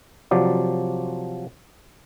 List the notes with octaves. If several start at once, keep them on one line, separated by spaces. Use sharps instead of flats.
C3 F3 F#3 D5